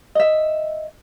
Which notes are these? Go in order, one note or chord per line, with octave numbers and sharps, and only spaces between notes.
D#5 E5